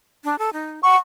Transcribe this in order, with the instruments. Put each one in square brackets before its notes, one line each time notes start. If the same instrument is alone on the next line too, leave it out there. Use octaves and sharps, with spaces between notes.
[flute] D4
A4
D#4
[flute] F#5 [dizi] C#6